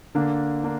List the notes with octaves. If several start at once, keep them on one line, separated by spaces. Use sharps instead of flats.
D3 A#3 D4
A#3 D4